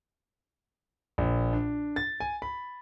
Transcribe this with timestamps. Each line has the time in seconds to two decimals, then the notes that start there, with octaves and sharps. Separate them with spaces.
1.18 A#1
1.53 D4
1.96 A6
2.20 G#5
2.42 B5